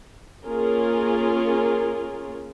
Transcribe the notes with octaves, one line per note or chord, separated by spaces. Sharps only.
A#3 C#4 F4 G#4 A#4